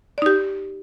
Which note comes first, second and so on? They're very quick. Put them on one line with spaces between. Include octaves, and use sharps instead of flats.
D5 D#4 G4